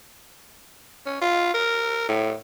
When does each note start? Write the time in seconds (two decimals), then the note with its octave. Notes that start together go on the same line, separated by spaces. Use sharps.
1.06 C#4
1.21 F4
1.54 A#4
2.09 A2